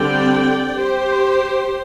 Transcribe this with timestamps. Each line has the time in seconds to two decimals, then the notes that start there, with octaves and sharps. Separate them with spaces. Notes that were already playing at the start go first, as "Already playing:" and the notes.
Already playing: D3 G3 C4 D5 G5
0.78 G4 C5